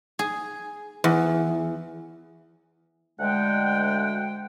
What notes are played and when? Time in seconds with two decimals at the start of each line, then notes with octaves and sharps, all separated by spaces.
0.19 G#4
1.04 E2
3.20 D2 G#3 F#5 G5